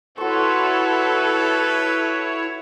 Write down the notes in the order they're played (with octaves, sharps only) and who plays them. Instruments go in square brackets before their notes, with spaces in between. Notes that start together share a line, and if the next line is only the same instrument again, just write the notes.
[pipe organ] E4 C#5 [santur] F#4 C6 C#6 [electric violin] A4 [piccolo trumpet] B4